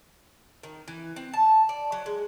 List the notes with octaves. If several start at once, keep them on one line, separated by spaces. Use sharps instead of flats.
D#3
E3
C4
A5
D5
F#3
G#3